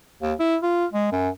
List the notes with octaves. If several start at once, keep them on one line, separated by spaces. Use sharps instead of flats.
D#2
E4
F4
G#3
F#2